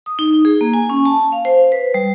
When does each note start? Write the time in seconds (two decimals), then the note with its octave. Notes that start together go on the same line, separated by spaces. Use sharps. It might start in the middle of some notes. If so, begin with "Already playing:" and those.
0.06 D#6
0.19 D#4
0.45 G#4
0.61 A#3
0.74 G#5
0.90 C#4
1.05 A5
1.32 F5
1.45 C5
1.72 B4
1.94 G3